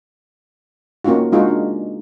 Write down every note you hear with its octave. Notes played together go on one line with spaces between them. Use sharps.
A#3 C#4 D#4 F4 F#4
G#3 D4 D#4 F4 F#4 G#4
D4